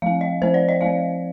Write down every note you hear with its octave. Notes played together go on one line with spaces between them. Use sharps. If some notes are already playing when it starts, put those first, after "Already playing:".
F3 C4 F5
D#5
F3 C4 C5
D5
D#5
F3 C4 F5